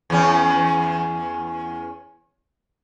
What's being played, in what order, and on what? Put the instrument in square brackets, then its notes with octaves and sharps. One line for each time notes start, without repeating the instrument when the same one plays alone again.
[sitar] E2 C#4